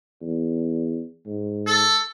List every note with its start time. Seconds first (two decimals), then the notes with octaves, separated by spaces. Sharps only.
0.21 E2
1.27 G#2
1.67 A4